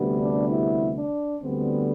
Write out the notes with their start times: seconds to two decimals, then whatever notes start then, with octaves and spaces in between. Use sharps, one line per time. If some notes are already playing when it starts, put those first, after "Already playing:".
Already playing: D2 C3 G3 B3
0.19 D4
0.49 E4
0.96 D4
1.40 D2 D3 G3 B3 C4